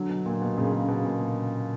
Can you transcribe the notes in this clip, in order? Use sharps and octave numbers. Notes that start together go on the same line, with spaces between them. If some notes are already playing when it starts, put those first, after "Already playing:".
Already playing: D3 F#3
B2
A#2
B2
A#2 C#3
A#2 C#3
B2
A#2